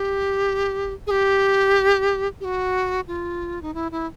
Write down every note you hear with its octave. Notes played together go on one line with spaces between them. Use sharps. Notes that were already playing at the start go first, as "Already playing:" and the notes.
Already playing: G4
G#4
G4
G4
F#4
F4
D#4
E4
E4